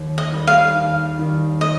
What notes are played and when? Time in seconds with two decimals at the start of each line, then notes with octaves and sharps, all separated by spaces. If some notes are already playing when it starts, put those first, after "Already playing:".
Already playing: D#2
0.18 D#5
0.32 D#3 G3
0.47 F5
0.75 D#2
1.18 D#3 G3
1.61 D#5